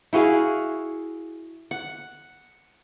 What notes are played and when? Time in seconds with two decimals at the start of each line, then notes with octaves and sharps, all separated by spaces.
0.13 E4 F#4 G#4 F5
1.71 F#5